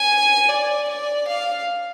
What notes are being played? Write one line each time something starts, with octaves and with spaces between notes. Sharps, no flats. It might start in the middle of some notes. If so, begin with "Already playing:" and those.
Already playing: G#5
D5
D5
F5